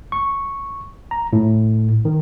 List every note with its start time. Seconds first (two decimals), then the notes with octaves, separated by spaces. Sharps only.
0.12 C#6
1.11 A#5
1.33 A2
2.05 D#3